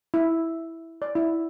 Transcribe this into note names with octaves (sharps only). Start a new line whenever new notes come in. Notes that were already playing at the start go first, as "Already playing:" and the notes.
E4
D5
E4